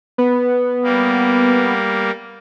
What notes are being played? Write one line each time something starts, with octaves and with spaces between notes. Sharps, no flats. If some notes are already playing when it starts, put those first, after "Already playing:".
B3
G3 A#3